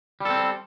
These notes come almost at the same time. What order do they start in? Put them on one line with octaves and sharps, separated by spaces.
G3 A4 C4